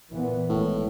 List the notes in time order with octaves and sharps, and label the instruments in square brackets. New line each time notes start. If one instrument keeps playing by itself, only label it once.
[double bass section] A#2 E3 B3
[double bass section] G#1 [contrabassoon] A2